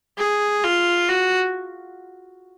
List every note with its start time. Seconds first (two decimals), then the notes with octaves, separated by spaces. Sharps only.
0.18 G#4
0.64 F4
1.09 F#4